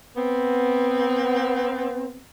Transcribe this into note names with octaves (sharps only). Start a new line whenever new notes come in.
B3 C4